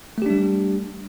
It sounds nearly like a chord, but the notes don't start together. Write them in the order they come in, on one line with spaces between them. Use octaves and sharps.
A3 G4 D4 G3